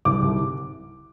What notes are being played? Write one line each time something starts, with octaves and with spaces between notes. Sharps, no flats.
C2 D6
C2